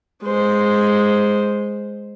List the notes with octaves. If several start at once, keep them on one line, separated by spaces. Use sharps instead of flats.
G#3 C5